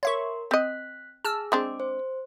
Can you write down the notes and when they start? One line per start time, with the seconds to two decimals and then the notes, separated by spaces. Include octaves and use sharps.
0.03 A#4 C#5 E5 C6 C#6
0.51 C4 D#5 F#6 B6
1.25 G#4 A5 E6 F6
1.52 G#3 C4 D4 D6
1.80 C5